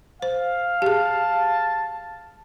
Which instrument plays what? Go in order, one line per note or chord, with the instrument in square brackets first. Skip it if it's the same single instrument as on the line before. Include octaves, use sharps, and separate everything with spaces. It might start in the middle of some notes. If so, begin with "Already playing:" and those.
[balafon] C5 [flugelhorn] F5
[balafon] G4 G#4 [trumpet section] A5